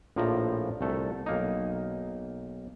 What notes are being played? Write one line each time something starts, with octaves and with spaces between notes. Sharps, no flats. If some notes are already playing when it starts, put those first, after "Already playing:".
A#1 A2 F3 D5 A#5
C2 A3 A4
B1 A#3 D#4